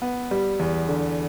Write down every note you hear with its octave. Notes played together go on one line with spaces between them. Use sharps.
B3
G3
E2
D3